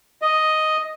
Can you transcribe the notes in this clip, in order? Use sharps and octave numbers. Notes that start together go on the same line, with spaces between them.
D#5